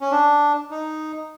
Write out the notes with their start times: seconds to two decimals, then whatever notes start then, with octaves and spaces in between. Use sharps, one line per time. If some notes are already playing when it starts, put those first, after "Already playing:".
0.01 C#4
0.11 D4
0.71 D#4